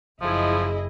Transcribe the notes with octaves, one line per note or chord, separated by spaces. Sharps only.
F#1 F3 E4 G#4 D#5